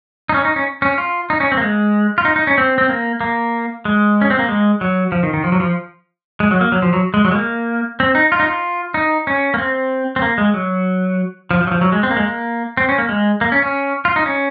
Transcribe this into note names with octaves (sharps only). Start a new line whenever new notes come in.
D#4
C#4
D#4
C#4
C#4
F4
D#4
C#4
C4
A#3
G#3
F4
D#4
D#4
C#4
C4
C4
A#3
A#3
G#3
C#4
C4
A#3
G#3
F#3
F3
D#3
D#3
F3
F#3
F3
G#3
F#3
A#3
F#3
F3
F#3
G#3
F#3
G#3
A#3
C4
D#4
F4
D#4
F4
D#4
C#4
A#3
C4
C4
A#3
G#3
F#3
F3
F3
F#3
F3
F#3
G#3
C4
A#3
G#3
A#3
C4
C#4
A#3
G#3
A#3
C#4
C#4
F4
D#4
C#4